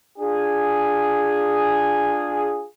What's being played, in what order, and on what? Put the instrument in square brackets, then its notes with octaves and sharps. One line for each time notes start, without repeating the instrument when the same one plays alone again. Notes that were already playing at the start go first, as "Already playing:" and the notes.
[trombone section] D4 F4 G#4